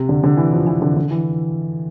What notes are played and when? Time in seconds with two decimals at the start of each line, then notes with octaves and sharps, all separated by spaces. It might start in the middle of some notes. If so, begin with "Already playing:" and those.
Already playing: C3
0.09 D3
0.23 D3
0.37 E3
0.53 F3
0.67 E3
0.82 D3
0.97 D3
1.11 E3